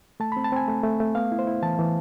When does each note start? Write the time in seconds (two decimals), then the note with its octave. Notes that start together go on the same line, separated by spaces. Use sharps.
0.20 A3 A5
0.32 C4 B5
0.44 A5
0.52 C4 G#5
0.68 A3
0.84 A3
1.00 A3
1.15 B3 F5
1.32 E4
1.39 C5
1.47 E4
1.62 E3 A5
1.79 E3